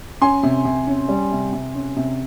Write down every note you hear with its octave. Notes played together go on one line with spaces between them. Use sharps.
C#4 G#5 C6
C3
C3
C#4
G3
C3
C3
C#4
C3